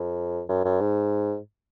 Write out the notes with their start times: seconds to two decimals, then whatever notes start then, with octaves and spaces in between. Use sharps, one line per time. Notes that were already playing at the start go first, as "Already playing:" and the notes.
Already playing: F2
0.49 F#2
0.65 F#2
0.80 G#2